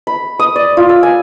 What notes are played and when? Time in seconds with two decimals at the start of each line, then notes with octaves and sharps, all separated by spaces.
0.07 B5
0.39 D#6
0.56 D5
0.77 F4
0.89 E6
1.03 G#5